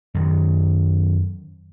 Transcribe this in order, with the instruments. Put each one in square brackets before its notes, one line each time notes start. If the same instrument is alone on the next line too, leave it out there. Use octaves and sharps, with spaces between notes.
[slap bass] F#2 D#3 F#3